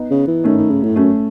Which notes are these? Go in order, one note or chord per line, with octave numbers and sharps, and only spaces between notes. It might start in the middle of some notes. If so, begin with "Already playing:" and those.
Already playing: B3 D#4
C#3
E3
D#3 A3 C#4
D#3
C#3
A2
F#2 A3 C#4